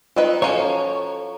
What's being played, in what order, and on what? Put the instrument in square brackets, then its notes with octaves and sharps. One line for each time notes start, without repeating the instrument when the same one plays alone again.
[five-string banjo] C4 D#4 B4 [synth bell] F4 D#5
[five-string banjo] F3 C#4 F#4 [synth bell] A4 A#5 [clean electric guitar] C#5